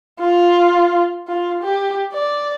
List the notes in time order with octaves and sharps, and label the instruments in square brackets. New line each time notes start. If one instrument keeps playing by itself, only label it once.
[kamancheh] F4
F4
G4
D5